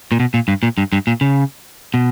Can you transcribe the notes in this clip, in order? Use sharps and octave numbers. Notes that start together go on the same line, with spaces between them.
A#2
B2
A#2
G2
A#2
G2
G2
A#2
C#3
B2